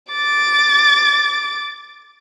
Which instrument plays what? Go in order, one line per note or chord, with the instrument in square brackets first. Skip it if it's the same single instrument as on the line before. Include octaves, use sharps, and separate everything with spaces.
[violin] D6 A6